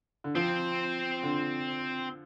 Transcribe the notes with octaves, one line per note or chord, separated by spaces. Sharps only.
D3
F3 C4
D3